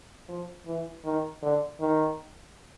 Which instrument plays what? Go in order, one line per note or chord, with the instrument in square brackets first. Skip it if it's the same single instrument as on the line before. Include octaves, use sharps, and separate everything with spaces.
[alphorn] F3
E3
D#3
D3
D#3